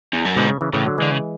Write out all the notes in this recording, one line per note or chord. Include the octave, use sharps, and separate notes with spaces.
E2
F#2
G#2 B2 D3
C#3
C#3 E3
A2 C#3 E3
D3 F#3
D3 E3 G#3
C#3